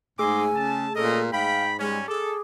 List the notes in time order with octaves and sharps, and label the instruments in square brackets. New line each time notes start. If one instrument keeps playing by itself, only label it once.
[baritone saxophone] G#2 [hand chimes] A3 G#4 E6 [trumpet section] D#5 C6 D6 [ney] G#5
[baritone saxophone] C#3 [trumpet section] A5
[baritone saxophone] A#2 [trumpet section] C#4 A#4 D#5 [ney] A4
[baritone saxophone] G#2 [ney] F5 [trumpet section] G5 B5
[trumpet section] G3 C#4 [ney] G#3
[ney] G#4 [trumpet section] A4 [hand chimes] D6